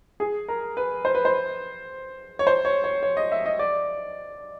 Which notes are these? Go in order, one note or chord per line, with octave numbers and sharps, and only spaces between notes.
G#4
A#4
B4
C5
B4
C5
C#5
C5
C#5
C#5
C#5
D#5
E5
D#5
D5